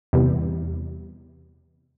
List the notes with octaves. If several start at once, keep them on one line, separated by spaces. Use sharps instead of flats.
E2 C3 G3